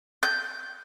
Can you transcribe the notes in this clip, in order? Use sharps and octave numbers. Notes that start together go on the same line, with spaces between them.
G6